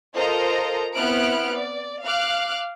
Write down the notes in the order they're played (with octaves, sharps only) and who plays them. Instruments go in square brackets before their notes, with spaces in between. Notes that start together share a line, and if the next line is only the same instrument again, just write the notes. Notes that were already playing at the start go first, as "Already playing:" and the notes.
[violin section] F4 A4 A#4 C5 D#5 A#5
B3 C4 E4 F6 F#6 D7
D5
F5 D6 F6 F#6